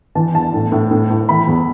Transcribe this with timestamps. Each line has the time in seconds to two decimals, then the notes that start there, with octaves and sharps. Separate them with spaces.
0.15 E3 A5
0.35 E2 A5
0.54 A2
0.72 A2
0.91 A2
1.10 A2
1.29 E3 B5
1.47 E2